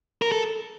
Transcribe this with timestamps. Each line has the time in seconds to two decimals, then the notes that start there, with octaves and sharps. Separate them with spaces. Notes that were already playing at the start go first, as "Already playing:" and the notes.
0.22 A#4
0.32 A4